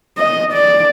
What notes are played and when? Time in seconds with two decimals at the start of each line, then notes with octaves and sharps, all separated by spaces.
0.18 D#5
0.53 D5